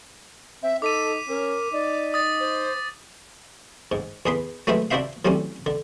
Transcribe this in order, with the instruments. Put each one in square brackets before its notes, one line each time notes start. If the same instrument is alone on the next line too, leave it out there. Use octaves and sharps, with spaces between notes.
[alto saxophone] C4 [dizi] E5
[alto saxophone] D#4 [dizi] A4 [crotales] D6 B6 D#7
[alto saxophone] C#4 [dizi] A#4
[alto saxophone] D#4 [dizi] D5
[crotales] D#6 A6
[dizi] C5
[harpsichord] G#2
E2 G#4 B4 C6
F#3 G#3 A3 E4 B4 C5
D4 E4 F#4 C5 E5 F5
A2 F#3 G3 C4 C#4
D3